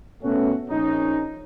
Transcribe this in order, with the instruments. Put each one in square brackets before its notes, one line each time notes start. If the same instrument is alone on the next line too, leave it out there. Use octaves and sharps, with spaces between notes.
[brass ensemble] B2 A3 C#4 F#4
A#1 C#4 D#4